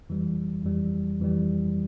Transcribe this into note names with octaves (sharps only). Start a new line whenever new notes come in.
F2 E3 G3
F2 E3 G3
F2 E3 G3